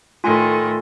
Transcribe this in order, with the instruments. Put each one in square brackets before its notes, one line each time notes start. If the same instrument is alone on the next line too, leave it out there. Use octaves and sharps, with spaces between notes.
[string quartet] A2 D#3 [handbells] F4 G#5 C6 [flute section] A4